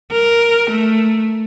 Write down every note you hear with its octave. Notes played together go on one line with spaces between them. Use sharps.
A#4
A3